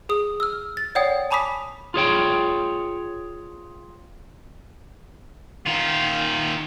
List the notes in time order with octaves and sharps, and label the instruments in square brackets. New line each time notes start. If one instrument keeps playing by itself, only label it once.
[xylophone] G#4 D#6
E6 F6
A6
C#5 D5 F#5 G5 D#6
G#5 A5 B5 D6 D#6 B6
[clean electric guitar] F4 G#4 C#5 G5
[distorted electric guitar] D#3 F4